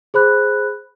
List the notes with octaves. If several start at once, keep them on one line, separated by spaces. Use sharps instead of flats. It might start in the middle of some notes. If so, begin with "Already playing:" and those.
G#4 C5 B5 F#6